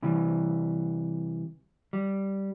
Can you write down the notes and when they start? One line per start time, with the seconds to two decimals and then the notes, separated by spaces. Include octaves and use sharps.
0.03 C3 E3 G3
1.93 G3